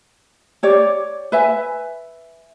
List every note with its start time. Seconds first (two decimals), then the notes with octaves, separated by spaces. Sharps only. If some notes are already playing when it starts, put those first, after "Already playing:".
0.63 G4 C#5 D5
1.32 B4 E5 G#5